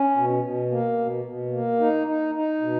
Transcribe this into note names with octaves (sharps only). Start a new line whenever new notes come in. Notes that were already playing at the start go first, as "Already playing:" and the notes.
Already playing: C#4
B2
B2
A#3
B2
B2
A#3
D#4
D#4
D#4
B2